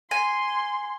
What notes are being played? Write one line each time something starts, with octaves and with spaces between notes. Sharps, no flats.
G#5 C6